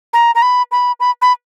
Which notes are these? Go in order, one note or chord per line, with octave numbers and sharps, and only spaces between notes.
A#5
A#5
B5
B5
B5
B5